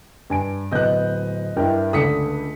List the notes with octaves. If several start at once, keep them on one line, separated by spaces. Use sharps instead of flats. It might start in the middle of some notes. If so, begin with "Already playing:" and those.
G2 G#5 D7
D1 B3 D#5 F#6 G6
G2 E4 A#4 G5
C#2 D3 A3 D#6 B6 C#7